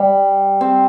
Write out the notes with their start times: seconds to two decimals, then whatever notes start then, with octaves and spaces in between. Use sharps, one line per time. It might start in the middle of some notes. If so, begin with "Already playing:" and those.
Already playing: G3
0.61 C4